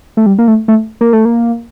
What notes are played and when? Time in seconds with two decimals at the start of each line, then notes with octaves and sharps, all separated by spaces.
0.17 A3
0.26 G3
0.38 A#3
0.47 A3
0.68 A3
1.01 A#3
1.13 A3
1.25 A#3